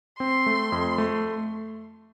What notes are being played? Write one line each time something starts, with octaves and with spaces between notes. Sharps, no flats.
C4 C6
A3
F2
A3